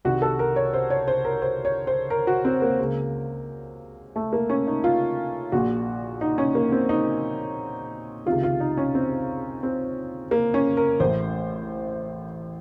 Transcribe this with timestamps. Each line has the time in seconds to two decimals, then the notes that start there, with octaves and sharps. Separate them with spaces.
0.05 C2 C3 D#3 F#4
0.22 A4
0.39 A#4
0.56 C#5
0.74 C5
0.90 C#5
1.08 C5
1.25 A#4
1.42 C5
1.65 C#5
1.87 C5
2.10 A#4
2.27 F#4
2.45 C4
2.62 A#3
2.79 C#2 C#3
4.16 A3
4.33 A#3
4.50 C#4
4.67 D#4
4.84 F4
5.52 A#1 A#2 F#4
6.21 D#4
6.38 C#4
6.55 A#3
6.72 C4
6.89 D#4
8.26 C#2 C3 D#3 F4
8.43 F4
8.60 D#4
8.77 C#4
8.95 C4
9.63 C4
10.31 A#3
10.54 C#4
10.77 A#4
11.00 A1 A2 C5